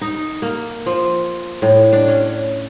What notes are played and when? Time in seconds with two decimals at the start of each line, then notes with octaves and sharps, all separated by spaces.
0.01 D#4
0.42 A#3
0.86 F3
1.62 A2
1.93 D4
2.08 C#4